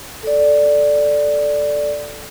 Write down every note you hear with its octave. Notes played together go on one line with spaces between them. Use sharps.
A4 D5